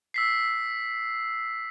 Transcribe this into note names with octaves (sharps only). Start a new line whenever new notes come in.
E6 B6 C7